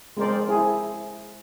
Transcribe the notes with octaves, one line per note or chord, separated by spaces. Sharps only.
G#3 C4 A#4 C5 D5
C4 E4 G#4